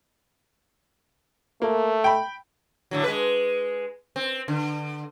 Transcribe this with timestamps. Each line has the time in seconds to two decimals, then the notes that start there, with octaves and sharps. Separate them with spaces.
1.62 A3 A#3
2.04 G5 B5
2.91 A2 D3 F#3
3.04 G#3 B4
4.16 C4
4.48 D3